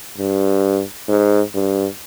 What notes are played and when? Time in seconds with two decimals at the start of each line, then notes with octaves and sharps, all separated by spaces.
0.18 G2
1.09 G#2
1.55 G2